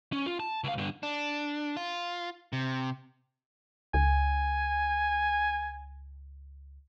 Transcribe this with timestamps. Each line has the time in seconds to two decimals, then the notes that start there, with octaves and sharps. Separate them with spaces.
0.13 C#4
0.26 F4
0.40 A5
0.64 C#2 F5
0.78 G2 D3
1.03 D4
1.77 F4
2.53 C3
3.94 C#2 G#5